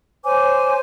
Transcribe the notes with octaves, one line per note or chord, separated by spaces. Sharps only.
C5 C#5 G#5 D6